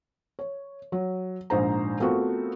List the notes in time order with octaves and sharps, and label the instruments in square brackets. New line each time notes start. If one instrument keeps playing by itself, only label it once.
[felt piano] C#5
F#3
A#1 G#2 C5 A#5
A3 B3 C4 F4 F#4 A#4